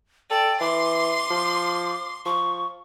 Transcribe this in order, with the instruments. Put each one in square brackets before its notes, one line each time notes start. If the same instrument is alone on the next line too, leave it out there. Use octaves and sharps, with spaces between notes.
[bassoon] A4 [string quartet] D5 [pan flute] G5
[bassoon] E3 [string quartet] C6 [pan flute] D6
[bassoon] F3
[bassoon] F3 [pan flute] C#6